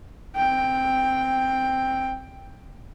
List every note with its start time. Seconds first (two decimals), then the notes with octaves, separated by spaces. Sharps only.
0.36 C4 G5